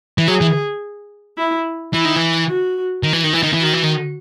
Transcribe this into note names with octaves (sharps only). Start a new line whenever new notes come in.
E3
F#3 G#4
E3
E4
E3 E4
D#3
E3
F#4
D#3
E3
D#3
E3
D#3
E3
D#3 F#4
E3
D#3